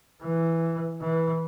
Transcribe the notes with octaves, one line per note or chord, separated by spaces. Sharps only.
E3
E3